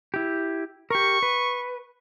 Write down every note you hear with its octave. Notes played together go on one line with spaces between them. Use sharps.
E4 G4
G4 A#4 C#6
B4